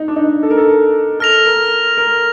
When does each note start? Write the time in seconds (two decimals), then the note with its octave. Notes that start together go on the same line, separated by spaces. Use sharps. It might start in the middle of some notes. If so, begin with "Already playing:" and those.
Already playing: D#4
0.08 D4
0.16 D#4
0.43 A4
0.50 A#4
0.58 A4
1.20 A4 F6 A#6 F7
1.45 A#4
1.97 A#4